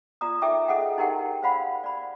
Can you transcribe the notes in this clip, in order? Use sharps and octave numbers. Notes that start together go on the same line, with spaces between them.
F4 D5 A#5 D#6
D#4 A4 E5 G5 D6
G#4 A4 D#5 E5 F#5 G5
D#4 E4 G4 A#4 F#5 G5
C5 D5 F5 F#5 B5
D5 B5